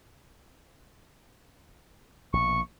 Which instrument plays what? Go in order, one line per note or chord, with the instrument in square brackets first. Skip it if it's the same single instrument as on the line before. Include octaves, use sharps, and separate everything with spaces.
[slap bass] A#1 B2 [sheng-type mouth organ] C#6